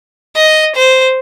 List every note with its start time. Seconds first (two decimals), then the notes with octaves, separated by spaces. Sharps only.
0.36 D#5
0.76 C5